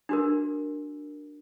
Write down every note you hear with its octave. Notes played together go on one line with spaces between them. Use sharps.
D4 F#4 A#4